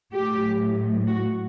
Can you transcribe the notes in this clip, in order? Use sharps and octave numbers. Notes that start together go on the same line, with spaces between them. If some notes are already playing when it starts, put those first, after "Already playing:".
A2 F#3 G4
F#4